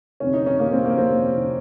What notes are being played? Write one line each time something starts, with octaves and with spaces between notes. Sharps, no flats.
F2 C3 D#3 C#4
D#4
C#4
F2 C3 D#3 A#3
C4
A#3
F2 C3 D#3 C4
C3 D#3